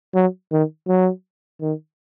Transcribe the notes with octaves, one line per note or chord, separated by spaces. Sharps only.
F#3
D#3
F#3
D#3